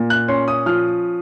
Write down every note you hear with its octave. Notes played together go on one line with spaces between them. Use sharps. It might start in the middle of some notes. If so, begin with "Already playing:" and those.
Already playing: A#2
F#6
C#4 C6
D#6
F3 F6